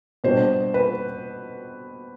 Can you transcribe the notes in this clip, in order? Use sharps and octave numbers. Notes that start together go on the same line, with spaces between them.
B2 G3 D4 C5
B4